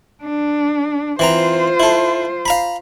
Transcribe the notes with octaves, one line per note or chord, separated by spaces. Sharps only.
D4
E3 C4 F4 C5 A#5
E4 A4
F5 A#5 B5